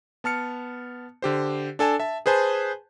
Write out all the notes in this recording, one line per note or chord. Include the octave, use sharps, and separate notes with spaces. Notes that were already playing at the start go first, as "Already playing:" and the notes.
B3 A5 F6 C#7
D3 G4 C5
D4 A4 G#5 A5
E5 A5
G#4 B4 C5 G#5 A5